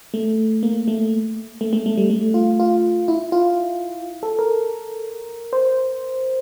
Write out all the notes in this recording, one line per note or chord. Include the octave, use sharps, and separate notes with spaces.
A3
A#3
A3
A3
A3
A3
G3
A3
F4
F4
E4
F4
A4
A#4
C5